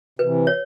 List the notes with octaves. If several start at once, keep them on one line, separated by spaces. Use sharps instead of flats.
C3 E3 B4
C#5